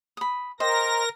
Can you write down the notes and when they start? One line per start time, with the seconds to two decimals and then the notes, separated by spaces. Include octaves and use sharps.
0.17 B5 D#6
0.60 A#4 C5 D#5 G5 A#6